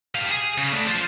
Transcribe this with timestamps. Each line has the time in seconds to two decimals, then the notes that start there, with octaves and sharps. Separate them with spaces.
0.15 G3 F5
0.30 G#4
0.58 C#3
0.72 A3 D4
0.87 F4 C5